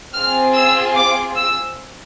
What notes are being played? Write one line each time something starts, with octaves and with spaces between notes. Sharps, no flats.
C4 F4 G#4 F6
E6
D6
E6